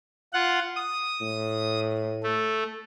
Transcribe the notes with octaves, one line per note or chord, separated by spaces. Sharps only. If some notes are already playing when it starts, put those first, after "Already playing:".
F4 F#5
D#6
A2
A3